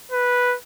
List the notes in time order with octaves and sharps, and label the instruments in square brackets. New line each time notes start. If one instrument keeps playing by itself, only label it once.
[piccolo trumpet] B4